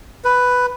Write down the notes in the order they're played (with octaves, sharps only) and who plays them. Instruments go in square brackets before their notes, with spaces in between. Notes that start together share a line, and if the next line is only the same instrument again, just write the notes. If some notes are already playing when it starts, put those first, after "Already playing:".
[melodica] B4